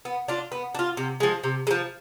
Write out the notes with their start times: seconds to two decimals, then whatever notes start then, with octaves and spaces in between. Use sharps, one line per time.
0.05 B3
0.28 D4 F4
0.52 B3
0.75 D4
0.79 F4
0.97 C3
1.20 F3 G#3
1.44 C3
1.67 G#3
1.71 F3